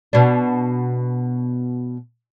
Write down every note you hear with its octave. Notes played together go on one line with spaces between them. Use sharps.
B2 D4